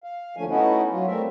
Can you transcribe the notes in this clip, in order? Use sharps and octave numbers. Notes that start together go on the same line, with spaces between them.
F5
D#2 D3 F3 A3 C#4 G#5
A3 B3 C#4 D#4 E4 F#4
F#3 C#4 F4
G3 A3 C4 A#4 E5